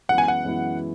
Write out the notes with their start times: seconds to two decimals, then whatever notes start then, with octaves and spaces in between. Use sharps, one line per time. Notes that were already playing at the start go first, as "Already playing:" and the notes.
0.09 F#2 E3 G#3 B3 E4 F#5
0.18 G#5
0.28 F#5
0.45 F#2 E3 G#3 B3 E4